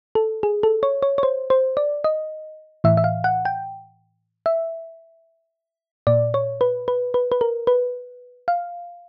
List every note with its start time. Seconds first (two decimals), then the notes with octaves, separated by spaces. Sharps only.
0.15 A4
0.43 G#4
0.63 A4
0.83 C#5
1.03 C#5
1.18 C#5
1.23 C5
1.50 C5
1.77 D5
2.04 D#5
2.84 A2 E3 E5
2.97 E5
3.04 F5
3.24 F#5
3.45 G5
4.46 E5
6.07 A#2 D5
6.34 C#5
6.61 B4
6.88 B4
7.14 B4
7.32 B4
7.41 A#4
7.67 B4
8.48 F5